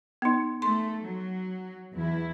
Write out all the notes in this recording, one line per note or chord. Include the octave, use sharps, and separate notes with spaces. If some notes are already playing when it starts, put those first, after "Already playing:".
B3 D#4
A3 A4 C6
F#3
E2 E4